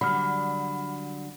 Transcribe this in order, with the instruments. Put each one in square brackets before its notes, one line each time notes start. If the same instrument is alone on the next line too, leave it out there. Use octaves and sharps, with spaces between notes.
[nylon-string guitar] D3 F#3 G3 [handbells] B5 F6